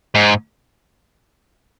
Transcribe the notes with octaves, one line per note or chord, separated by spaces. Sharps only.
G#2